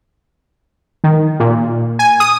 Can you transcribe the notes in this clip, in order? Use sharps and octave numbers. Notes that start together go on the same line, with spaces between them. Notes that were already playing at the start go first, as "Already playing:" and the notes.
D#3
A#2
G#5
D#6